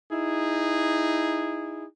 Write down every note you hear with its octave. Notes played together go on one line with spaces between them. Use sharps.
D#4 E4 G#4